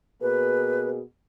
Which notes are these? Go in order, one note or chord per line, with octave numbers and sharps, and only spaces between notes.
B2 A#3 G#4 B4